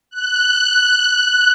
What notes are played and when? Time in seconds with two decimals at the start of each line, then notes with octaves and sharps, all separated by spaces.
0.10 F#6